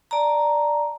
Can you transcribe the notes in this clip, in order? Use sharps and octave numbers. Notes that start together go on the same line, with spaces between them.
D5 A5 A#5